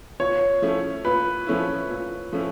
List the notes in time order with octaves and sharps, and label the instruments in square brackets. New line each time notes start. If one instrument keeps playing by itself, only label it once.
[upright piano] A#2 [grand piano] C#5
[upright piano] F3 A3 C#4 E4
[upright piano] A#2 [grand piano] B4
[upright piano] F3 A3 C#4 E4
A#2
F3 A3 C#4 E4